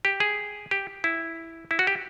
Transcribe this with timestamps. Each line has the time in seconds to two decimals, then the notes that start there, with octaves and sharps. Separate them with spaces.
0.05 G4
0.20 G#4
0.71 G4
1.04 E4
1.71 E4
1.79 F#4
1.87 G4